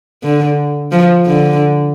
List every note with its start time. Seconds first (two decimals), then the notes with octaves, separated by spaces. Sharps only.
0.23 D3
0.92 F3
1.26 D3